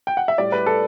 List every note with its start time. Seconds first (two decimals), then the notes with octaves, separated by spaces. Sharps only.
0.07 G5
0.17 F#5
0.28 E5
0.38 A2 G3 D5
0.52 B4
0.66 A4